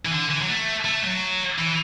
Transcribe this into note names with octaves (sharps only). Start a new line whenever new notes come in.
E3
D3
E3
F#3
A3
A3
F#3
E3